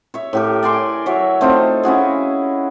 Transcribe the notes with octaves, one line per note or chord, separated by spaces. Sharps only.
C#5 E5
A2 G4 A#4
D5 G#5 C6 D6
F#3 C#5 E5
A3 C4 D#4 F4
C#4 E4 F#4 G#4